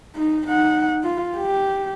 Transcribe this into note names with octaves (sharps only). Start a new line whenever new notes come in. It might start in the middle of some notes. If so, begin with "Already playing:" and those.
D#4
D#4 F#5
F4
G4